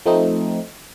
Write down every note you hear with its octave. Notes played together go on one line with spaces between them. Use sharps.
F3 A3 C4 D#4